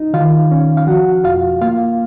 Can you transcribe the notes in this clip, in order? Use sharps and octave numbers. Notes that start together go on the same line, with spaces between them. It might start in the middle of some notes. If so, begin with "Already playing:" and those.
Already playing: D#4
D#3 F4 F5
C#4
F5
F3 F#4 F#5
F2 F4 F5
A#3 F4 F5